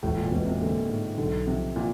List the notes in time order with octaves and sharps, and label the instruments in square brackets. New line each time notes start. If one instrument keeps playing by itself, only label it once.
[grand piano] E1 [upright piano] A2
[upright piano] A#2
[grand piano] E1 [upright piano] B2
[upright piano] C3
[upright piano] D3 [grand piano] A#3
[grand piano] G#2
[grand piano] B1 [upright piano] D3
[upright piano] C3 [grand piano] F3
[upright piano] A#2 [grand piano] E4